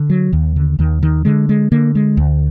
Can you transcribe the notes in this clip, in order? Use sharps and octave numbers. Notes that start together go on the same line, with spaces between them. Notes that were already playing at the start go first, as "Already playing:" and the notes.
Already playing: D3
F#3
D#2 D#3
D3
D#2 D#3
D#3
D3 G#3
G#3
D3 A#3
G#3
D2